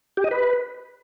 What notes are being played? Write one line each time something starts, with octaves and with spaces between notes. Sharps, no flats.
G4
D#5
B4